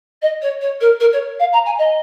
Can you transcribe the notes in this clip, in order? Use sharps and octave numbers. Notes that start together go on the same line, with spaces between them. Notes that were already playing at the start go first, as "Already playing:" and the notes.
D#5
C#5
C#5
A#4
A#4
C#5
F5
A#5
G#5
D#5